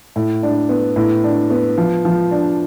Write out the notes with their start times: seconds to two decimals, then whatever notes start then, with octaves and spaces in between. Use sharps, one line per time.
0.16 A2
0.43 D4
0.69 B3
0.96 A2
1.24 D4
1.50 B3
1.78 F3
2.05 F3
2.31 D4